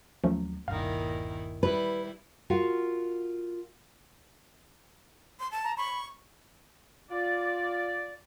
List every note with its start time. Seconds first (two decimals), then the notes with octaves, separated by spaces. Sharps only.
0.24 D#2 F3 F#3 A3 C#4
0.68 G1 D#2 A#2 D#3 E4 F5
1.63 G3 E4 B4
2.50 F4 F#4 A#4 F5
5.40 C6
5.51 A5
5.64 A#5
5.77 B5 C#6
7.10 F4 D5